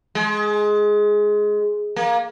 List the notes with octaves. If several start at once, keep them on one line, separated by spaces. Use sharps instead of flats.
G#3
A#3